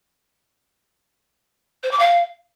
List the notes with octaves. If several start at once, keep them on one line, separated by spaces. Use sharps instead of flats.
C5
D6
F5